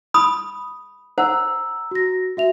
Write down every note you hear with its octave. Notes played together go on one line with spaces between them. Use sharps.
B5 D#6
C5 F#5 A#5 E6
F#4 A#6
F#4 E5 F7